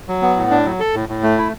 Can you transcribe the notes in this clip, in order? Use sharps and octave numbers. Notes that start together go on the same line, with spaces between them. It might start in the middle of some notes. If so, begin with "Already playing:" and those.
F#3
B3
A2
D4
F#3
A4
A2
A2
A3
E4